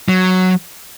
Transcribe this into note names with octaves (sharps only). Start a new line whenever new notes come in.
F#3